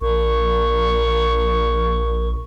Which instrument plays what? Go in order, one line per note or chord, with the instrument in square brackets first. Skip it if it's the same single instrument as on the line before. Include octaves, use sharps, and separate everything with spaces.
[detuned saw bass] A#1 [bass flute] A#4 [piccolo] C#6